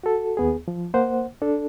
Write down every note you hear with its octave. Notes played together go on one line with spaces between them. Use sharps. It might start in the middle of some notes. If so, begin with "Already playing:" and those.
F#4 A4
D#2 B3 G#4
F3
A#3 C5 F#5
D4 A4